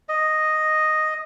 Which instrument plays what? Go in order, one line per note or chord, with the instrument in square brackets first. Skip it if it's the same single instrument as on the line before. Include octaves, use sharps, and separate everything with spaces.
[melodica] D#5